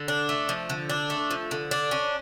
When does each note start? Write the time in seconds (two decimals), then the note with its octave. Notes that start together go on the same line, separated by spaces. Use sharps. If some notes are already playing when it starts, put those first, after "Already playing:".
Already playing: D3
0.08 D4
0.29 A3
0.49 F3
0.70 D3
0.90 D4
1.10 A3
1.31 F3
1.51 D3
1.71 D4
1.91 C#4